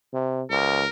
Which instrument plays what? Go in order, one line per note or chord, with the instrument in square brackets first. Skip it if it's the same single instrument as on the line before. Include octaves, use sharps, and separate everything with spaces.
[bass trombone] C3
[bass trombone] C#2 [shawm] A#4